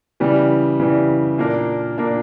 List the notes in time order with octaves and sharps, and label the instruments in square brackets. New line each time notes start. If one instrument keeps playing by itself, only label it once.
[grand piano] C#3 E3 G3
C#3 E3 G3
A#2 A#3 D4 A#4
A#2 A#3 D4 A#4